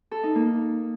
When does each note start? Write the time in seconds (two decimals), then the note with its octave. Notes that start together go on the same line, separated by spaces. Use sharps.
0.11 A4
0.23 D#4
0.35 A#3